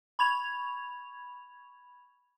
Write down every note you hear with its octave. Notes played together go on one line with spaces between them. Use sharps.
B5 C#6 G#6 F7